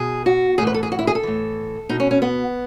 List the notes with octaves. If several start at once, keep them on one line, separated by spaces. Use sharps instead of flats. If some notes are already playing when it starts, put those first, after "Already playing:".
Already playing: B2 G#4
F#4
A2 E3 G#4
B4
A4
G#4
F#4
E4
G#4
A4
A2 E3
B2 D#4
C#4
C#4
B3